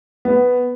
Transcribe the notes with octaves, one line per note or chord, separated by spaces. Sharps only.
B3